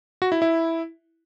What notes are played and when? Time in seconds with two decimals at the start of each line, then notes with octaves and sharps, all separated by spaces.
0.22 F#4
0.32 E4
0.42 E4